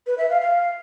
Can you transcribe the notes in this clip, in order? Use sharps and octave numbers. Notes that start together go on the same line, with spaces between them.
B4
E5
F5
F5